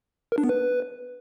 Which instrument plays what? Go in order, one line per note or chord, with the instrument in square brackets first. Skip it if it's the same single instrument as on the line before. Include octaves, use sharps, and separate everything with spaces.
[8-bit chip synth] A#4
D4
B3
B4